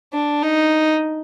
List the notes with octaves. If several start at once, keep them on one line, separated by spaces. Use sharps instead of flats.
D4
D#4